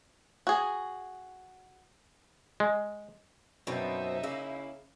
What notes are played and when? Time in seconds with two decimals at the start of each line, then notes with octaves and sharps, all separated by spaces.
0.47 F#4 G#4
2.60 G#3
3.67 F#2 B2 F3 C4 D#4 E5
4.23 C#3 A#3 E4